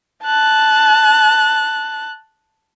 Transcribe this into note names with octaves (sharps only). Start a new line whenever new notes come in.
A5 F#6